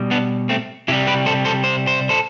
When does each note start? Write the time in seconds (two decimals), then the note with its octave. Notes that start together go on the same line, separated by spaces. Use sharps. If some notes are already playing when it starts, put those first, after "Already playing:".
Already playing: B2 G3
0.11 B3 D4
0.49 A3 C4
0.88 C3 G3 E4 G4
1.07 G4 B4
1.26 A4 C5
1.45 A4 C5
1.64 C5
1.87 C5
2.09 A4 C5